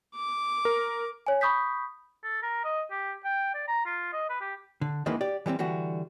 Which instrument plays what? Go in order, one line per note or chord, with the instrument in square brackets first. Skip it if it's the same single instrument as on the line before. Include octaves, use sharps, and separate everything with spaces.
[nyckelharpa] D6
[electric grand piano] A#4
[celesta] C#5 G#5
B5 C#6 D#6 G6 B6
[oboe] A4
A#4
D#5
G4
G5
D5
A#5
F4
D#5
B4
G4
[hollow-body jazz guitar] D3
D2 D#3 E3 G#3 A#3 B4
G4 D5
E3 G3 A3 C4
D3 E3 G3 F#4